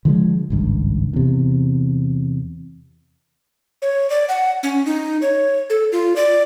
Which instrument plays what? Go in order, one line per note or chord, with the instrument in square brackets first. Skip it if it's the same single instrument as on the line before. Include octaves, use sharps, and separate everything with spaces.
[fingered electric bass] D3 F3 G3 G#3
G#1 C#2 G2
E2 C3
[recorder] C#5
D5
F#5
C#4
D#4
C#5
A4
F4
D5